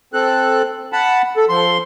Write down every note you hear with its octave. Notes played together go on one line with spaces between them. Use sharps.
C4 A4 F#6
F#5 A5 B5
A4
F3 C6